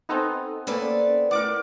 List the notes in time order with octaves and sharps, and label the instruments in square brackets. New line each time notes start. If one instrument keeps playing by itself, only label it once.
[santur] B3 C4 G#5 [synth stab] D#4 A4
[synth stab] A#3 C#4 [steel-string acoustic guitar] A4 B4 D5
[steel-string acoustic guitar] A2 [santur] A#4 D5 [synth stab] F#5 D6